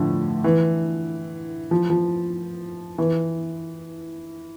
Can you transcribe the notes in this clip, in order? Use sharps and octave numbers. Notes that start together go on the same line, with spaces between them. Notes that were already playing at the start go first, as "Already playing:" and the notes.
Already playing: A2 D3 F3
E3
F3
F3
E3